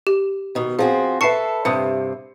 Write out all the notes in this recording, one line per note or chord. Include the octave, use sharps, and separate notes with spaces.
G4
B2 D#3
F3 C4 F#4 G#4
A4 B4 E5 A5 C#6 C7 C#7
G2 C3 E5 D#6 C#7